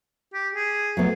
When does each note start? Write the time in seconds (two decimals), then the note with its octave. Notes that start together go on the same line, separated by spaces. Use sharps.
0.34 G4
0.55 G#4
0.97 F#3 A3 B3